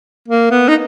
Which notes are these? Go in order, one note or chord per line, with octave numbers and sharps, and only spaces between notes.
A#3
B3
D#4